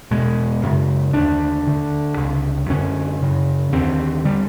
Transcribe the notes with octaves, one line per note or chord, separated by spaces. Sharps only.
E2 B2 G#3
F#2 C#3
D#2 D3 D4
D2 D3
C#2 C3
F#2 D3 C#4
F#2 C#3
D#2 D3 C4
D3 G3